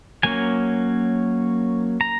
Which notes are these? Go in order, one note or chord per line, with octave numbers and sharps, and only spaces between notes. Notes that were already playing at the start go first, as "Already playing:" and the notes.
F#3 A#3 C#4 G#5
A#5